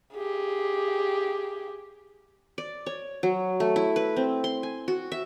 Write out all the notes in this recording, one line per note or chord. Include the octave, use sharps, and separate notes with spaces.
G4 G#4
D5
C#5
F#3
A3
E4
B4
C4
C6
G#5
F#4
E5